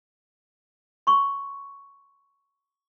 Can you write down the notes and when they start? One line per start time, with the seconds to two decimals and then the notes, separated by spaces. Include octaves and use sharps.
1.07 C6 C#6